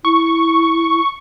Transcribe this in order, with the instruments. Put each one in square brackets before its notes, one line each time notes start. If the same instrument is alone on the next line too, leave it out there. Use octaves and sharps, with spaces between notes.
[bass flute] E4 [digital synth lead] C#6